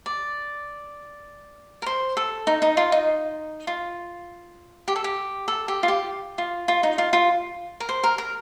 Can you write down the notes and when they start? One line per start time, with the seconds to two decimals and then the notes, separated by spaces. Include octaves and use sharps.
0.06 D5
1.82 A#4
1.86 C5
2.17 A4
2.47 D#4
2.62 D#4
2.77 F4
2.92 D#4
3.67 F4
4.88 G4
4.96 A4
5.04 G4
5.48 A4
5.68 G4
5.83 F4
5.88 G4
6.38 F4
6.68 F4
6.83 D#4
6.98 F4
7.13 F4
7.80 A#4
7.89 C5
8.04 A#4
8.18 A#4